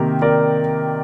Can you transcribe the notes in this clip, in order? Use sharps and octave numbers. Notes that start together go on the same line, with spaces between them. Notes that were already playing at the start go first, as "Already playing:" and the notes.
Already playing: C3 D#3 A#3 G4 A#4
A#4 D5